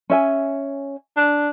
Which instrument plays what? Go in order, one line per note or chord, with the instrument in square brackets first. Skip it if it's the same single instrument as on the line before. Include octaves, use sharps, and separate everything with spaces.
[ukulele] C#4 E5 G#5
[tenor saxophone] D4